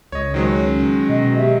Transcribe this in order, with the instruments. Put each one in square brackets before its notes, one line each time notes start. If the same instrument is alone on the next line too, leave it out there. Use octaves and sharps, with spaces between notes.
[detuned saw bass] C#2 [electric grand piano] C#5 D#5
[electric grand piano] D#3 F#3 G#3 [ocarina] C5
[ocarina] C#5
C#4
[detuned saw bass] B2 [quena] D#5
[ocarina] G4 [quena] E5